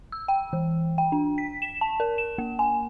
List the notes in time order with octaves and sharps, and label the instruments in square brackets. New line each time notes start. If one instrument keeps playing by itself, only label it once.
[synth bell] E6
G5
E3
G5
D4
B6
E7
A5
A#4
E7
A#3
G#5